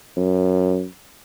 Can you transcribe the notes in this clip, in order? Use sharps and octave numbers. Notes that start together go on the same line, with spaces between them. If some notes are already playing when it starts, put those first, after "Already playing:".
F#2